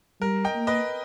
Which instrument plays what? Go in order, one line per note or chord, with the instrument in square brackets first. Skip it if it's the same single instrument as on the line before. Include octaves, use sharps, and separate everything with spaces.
[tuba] G3 [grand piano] A#4
[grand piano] D#5 G5
[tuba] A#3
[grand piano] B4 D#5